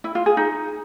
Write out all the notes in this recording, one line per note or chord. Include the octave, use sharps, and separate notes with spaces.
E4
F4
G#4
D#4